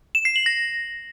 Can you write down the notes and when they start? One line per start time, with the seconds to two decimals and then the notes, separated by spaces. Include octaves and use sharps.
0.15 E7
0.25 C7
0.36 F#7
0.46 A#6